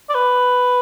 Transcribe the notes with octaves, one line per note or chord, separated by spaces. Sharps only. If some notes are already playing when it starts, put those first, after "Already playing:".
D5
B4